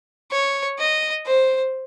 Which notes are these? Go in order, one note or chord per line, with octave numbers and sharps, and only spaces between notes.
C#5
D#5
C5